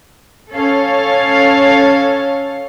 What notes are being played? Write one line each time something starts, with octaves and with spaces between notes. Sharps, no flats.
C#4 A4 C#5 F5